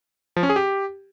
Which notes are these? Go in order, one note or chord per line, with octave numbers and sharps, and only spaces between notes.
F3
C#4
G#4
G4